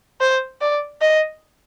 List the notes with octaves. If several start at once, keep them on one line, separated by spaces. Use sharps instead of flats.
C5
D5
D#5